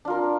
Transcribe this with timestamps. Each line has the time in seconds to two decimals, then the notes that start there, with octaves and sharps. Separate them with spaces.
0.05 D4
0.08 F4
0.10 A#4